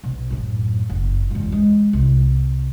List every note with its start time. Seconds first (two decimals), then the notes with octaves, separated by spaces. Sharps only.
0.04 B1
0.30 F#2 A2
0.89 F#1
1.31 G#1 E2
1.52 G#3
1.93 C2